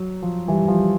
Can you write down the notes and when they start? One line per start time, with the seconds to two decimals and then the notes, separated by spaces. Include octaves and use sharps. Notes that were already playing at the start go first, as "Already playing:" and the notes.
Already playing: F#3
0.22 F3
0.48 E3 G3
0.68 F3